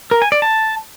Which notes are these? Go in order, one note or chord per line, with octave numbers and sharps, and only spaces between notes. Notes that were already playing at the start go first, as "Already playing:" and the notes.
A#4
G#5
D5
A5